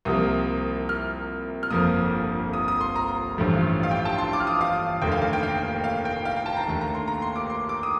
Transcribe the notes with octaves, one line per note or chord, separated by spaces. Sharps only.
C2 C3 F3 A#3 D#6
F6
F6
G1 F2 D3 F3 A#3 D#6
D#6
D#6
C6
A#5
A1 G2 D3 F3 A3
F5
G5
A5
C6
D6
F6
D#6
F5
F1 D#2 D3 A3 G5
F5
F5
G5
F5
F5
G5
F5
G5
A5
A#5
D#2 D3 A3
A#5
C6
A#5
C6
D6
C6
D6
D#6